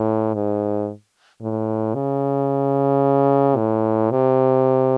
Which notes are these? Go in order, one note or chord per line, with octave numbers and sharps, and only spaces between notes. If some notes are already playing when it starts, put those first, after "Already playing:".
Already playing: A2
G#2
A2
C#3
A2
C3